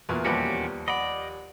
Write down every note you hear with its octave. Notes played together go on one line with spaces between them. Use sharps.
E2 A#2 F#4
D#2 F3 G3 C#4 F#4 G4 B4
D5 D#5 F#5 B5